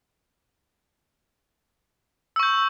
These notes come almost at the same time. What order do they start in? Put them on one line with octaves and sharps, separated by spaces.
E6 C#6 G6